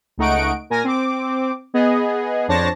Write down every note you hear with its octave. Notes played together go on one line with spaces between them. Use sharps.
C#2 A3 D#4 F#5 C#6 D7
A#2 A#4 G#5 A#6
C4 D6
B3 G#4 D#5
F2 D4 C5 C#5 A5 A#6